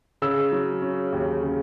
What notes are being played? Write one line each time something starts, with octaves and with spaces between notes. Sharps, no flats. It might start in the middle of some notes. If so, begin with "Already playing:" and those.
C#3 E6
F#3
C#4
D#2
C#3